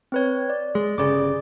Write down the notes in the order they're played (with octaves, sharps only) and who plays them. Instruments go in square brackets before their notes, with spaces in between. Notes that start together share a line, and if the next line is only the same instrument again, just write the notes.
[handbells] C4 B4 C#5
D5
[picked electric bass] G#3
[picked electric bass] G1 C#3 [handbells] G#4 D5 D6